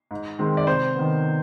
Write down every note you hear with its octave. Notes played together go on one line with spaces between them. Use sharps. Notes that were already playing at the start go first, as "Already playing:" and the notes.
G#2
D#3 G#3 C4
D5
C3 C5
D#3 B3